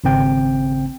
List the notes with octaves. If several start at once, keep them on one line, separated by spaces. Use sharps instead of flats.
G#1 C#3 C4 G5